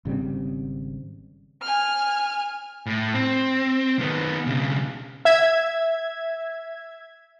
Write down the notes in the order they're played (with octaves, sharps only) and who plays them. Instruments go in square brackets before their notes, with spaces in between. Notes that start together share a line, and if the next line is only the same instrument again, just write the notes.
[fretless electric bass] G#1 C#3 G3 C4
[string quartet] G#5 F6
[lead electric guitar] A2
C4
D#3 B3
B1 C#3
[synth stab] E5 G#6